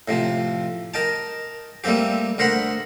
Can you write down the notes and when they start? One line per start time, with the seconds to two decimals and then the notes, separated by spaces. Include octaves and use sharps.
0.08 A2 C3 F3
0.94 A#4 D#5 G5 A5
1.84 G3 A3 A#3 C4 G4
2.38 D2 A#4 C5 F#5 B5